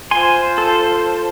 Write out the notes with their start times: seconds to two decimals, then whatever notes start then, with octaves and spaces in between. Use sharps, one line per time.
0.11 F4 C5 G#5 C6
0.58 A4